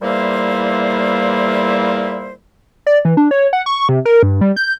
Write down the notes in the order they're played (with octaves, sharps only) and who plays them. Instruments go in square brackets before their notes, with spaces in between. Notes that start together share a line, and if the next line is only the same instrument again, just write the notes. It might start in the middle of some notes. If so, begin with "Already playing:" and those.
[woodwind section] E2 A#2 G3 A#3 E4 C5
[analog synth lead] D5
E3
D4
C#5
F#5
C#6
C3
A#4
G2
G3
G6